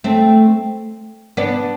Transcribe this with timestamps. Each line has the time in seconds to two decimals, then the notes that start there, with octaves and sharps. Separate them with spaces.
0.04 A3 C4
1.37 B3 D4